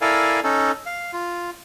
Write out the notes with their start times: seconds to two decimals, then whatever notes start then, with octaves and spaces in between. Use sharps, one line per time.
0.01 E4 A4 A#4 D5 F5 G#5
0.44 C#4 D#4 A4
0.86 F5
1.13 F4